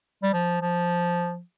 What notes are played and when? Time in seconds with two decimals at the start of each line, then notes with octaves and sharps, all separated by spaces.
0.23 G3
0.33 F3
0.62 F3